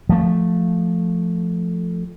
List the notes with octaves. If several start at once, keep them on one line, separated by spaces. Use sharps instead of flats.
F3 A3